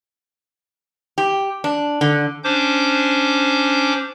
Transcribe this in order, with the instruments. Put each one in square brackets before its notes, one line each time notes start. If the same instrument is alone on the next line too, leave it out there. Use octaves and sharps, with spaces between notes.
[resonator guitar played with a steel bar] G4
D4
D3
[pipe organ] C#4 D4 C5 D6 G6